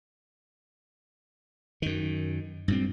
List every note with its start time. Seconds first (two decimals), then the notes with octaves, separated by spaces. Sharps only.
1.82 F#2 D#3
2.68 G2 A#2 C4